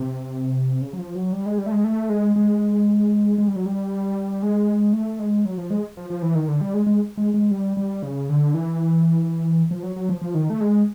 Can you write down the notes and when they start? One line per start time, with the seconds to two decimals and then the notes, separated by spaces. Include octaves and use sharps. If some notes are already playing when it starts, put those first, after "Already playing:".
Already playing: C3
0.82 C#3
0.93 F#3
0.99 F3
1.15 F#3
1.32 G3
1.46 G#3
1.58 G3
1.66 A3
1.72 G#3
1.84 A3
2.09 G#3
2.36 G#3
3.38 G#3
3.48 G3
3.56 F#3
3.66 G3
4.43 G#3
4.93 A3
5.19 G#3
5.45 F#3
5.58 F3
5.70 G#3
5.97 F3
6.10 F3
6.22 E3
6.35 D#3
6.48 D3
6.61 G3
6.74 G#3
6.87 G#3
7.17 G#3
7.34 G#3
7.51 G3
7.77 G3
8.03 C#3
8.29 D3
8.54 E3
9.71 F3
9.83 F#3
9.96 F#3
10.09 F3
10.22 F3
10.35 D#3
10.50 A3
10.61 G#3